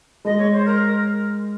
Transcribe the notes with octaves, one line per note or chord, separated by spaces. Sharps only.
G#3 D#5
C#5
C5
A#4